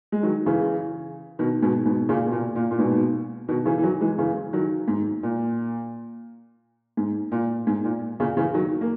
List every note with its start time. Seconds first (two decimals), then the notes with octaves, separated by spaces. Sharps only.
0.12 G#3
0.23 D#3 F#3
0.46 C#3 E3
1.39 B2 D#3
1.62 G#2 B2
1.86 G#2 B2
2.09 A#2 C#3
2.26 B2
2.32 A#2
2.56 A#2
2.71 A#2
2.79 G#2 B2
3.48 B2 D#3
3.65 C#3 E3
3.78 E3
3.83 D#3 F#3
4.01 E3 G#3
4.18 C#3 E3
4.53 D#3 F#3
4.88 G#2
5.23 A#2
6.97 G#2
7.32 A#2
7.67 G#2
7.84 A#2
8.20 A#2 C#3
8.37 C#3 E3
8.54 D#3 F#3
8.81 A#3